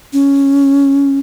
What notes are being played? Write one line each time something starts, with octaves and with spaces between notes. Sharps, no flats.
C#4